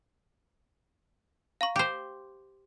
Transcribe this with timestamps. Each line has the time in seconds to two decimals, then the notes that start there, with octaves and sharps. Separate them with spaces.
1.61 F5 A#5 C#6
1.76 G4 C5